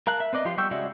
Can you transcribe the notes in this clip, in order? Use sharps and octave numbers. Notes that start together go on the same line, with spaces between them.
A#4 F5 A5 F#6
E5
C4 B4 D5 D#5
F3 F4 G4 C6
G3 B3 G5 C#6 E6
C#3 G#3 F#4 D5 E5